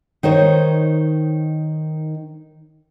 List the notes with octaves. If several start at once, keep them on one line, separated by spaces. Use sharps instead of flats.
D#3 D#4 C5 C#5